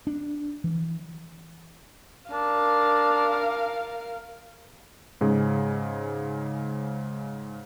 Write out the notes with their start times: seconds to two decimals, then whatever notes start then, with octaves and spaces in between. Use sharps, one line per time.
0.07 D4
0.64 E3
2.31 D4 A#4 F5
5.21 G#2 C#3 G#4